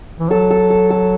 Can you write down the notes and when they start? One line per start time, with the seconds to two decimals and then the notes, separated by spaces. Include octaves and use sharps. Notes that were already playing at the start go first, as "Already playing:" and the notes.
0.19 E3
0.31 F#3 A4
0.51 A4
0.70 A4
0.90 A4